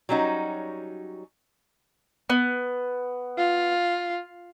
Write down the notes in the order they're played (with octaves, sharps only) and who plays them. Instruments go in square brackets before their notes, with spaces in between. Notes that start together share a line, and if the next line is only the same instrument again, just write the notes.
[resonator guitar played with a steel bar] F#3 G3 C#4 D#4 F#4
[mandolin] B3
[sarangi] F4